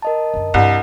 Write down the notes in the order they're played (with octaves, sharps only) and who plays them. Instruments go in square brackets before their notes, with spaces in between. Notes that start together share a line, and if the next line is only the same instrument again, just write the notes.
[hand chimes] A#4 D#5 A5
[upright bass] F#2 D3
[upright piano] C2 [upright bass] G2